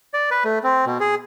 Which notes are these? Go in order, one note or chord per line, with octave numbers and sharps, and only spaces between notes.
D5
B4
A3
C4
B2
G#4